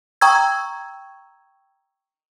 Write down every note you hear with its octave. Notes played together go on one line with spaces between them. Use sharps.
G5 A#5 C#6 D#6 E6 G#6